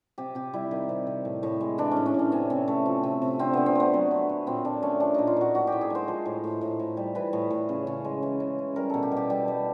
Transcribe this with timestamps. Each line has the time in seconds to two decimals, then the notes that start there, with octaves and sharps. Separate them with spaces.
0.18 C3 G4
0.35 C3 G4
0.53 G3 E4
0.71 D#3
0.89 C3
1.07 C3
1.25 A2
1.43 A2
1.60 G#3
1.78 E3 D4
1.91 C#4
1.97 A2
2.06 C#4
2.14 A2 D4
2.32 C3 C#4
2.50 C3
2.68 A3
2.86 F3
3.03 C3
3.22 C3
3.39 D3 C4
3.53 D3 B3
3.66 C4
3.75 A3 B3
3.94 F#3
4.11 D3
4.29 D3
4.47 A#2 C4
4.65 A#2 D4
4.82 A3 C#4
5.00 F3 D4
5.14 A#2 D#4
5.27 F4
5.36 A#2 F#4
5.54 A2 F#4
5.67 G4
5.72 A2
5.81 G#4
5.90 G#3 C5
6.08 F3
6.26 A2
6.44 A2
6.61 A2
6.80 A2
6.97 G3
7.15 E3 B4
7.33 A2
7.50 A2
7.69 C#3
7.87 C#3
8.05 G#3
8.23 E3
8.40 C#3
8.59 C#3
8.76 G3 A#4
8.90 B2 A4
9.03 G4
9.11 B2
9.17 G4
9.30 G3 G4
9.48 G3